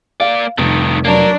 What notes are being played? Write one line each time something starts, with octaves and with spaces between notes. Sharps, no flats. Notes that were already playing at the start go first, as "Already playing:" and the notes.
A#3 D5 F5
F1 G2 D#3
F#3 A#3 D4 A#4